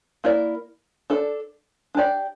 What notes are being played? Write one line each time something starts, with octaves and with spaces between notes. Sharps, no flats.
A#3 E4 A#4 D5
D4 A4 D5
D4 G4 D5